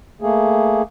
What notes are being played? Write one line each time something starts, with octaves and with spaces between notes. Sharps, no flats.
A3 A#3 G#4